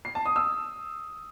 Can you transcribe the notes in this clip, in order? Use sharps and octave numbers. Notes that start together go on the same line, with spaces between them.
C7
A5
D#6
E6